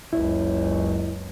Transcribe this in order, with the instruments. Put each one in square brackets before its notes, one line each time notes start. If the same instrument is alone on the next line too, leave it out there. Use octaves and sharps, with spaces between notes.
[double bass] F#1 C#2 [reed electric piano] E4